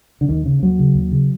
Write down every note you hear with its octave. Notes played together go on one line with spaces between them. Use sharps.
D3
D#2 D#3
C#3
D#2 F#3
C#3
D#2
C#3